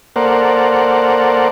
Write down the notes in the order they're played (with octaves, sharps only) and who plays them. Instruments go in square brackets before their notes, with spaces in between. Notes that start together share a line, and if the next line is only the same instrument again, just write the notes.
[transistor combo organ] A#3 A4 A#4 C5 D5 F#5